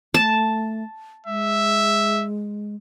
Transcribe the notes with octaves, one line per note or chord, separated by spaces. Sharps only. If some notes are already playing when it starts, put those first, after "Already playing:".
A3 A5
G#3 E5